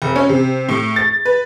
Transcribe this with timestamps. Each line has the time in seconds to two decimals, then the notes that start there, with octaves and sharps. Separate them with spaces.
0.02 F1
0.16 C#4
0.29 C3
0.69 A2
0.96 A6
1.25 B4